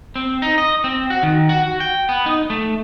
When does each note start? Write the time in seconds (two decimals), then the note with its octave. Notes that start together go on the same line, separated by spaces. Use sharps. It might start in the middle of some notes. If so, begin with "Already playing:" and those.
0.16 C4
0.42 D#4
0.58 D#5
0.84 C4
1.10 F#4
1.23 D#3
1.49 F#4
1.80 G5
2.09 B3
2.26 D#4
2.50 A3